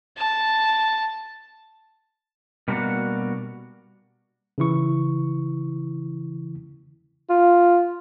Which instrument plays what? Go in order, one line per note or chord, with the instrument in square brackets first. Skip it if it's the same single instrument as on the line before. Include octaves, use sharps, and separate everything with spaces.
[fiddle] A5
[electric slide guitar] B2 G3 A#3 D4 F#4
[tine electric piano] C#3 E3 E4 C#6
[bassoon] F4